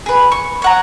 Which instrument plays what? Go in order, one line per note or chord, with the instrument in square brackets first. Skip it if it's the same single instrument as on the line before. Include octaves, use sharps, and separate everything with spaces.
[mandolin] G#4 B4
C#6
C#5 F#5 A#5